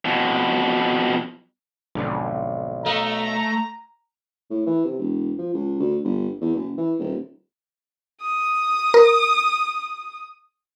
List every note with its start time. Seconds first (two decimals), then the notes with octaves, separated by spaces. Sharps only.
0.05 F2 B2
1.95 B1 F2 G#2 D3
2.86 A3 D#5 F5 A#5
4.50 A2
4.66 E3
4.85 C3
4.99 E1
5.38 F3
5.54 C#2
5.80 D2
6.04 G1
6.41 E2
6.55 F#1
6.78 E3
6.99 D#1
8.22 D#6
8.94 A#4